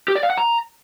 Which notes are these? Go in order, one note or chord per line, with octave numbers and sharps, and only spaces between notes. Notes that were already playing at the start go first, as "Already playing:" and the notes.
G4
D5
F5
F#5
A#5